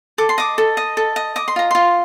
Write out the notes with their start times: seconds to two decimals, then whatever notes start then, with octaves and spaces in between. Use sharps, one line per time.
0.18 A4 D6
0.29 C6
0.38 D#5 D6
0.58 A4
0.77 D#5
0.97 A4
1.16 D#5
1.36 D#5 D6
1.48 C6
1.56 F4 A#5
1.71 F4 C6